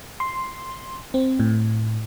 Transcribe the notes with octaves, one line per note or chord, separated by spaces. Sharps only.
C6
C4
A2